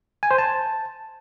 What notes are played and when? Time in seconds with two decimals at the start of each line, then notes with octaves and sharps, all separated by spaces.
0.23 G#5
0.31 C5
0.38 A5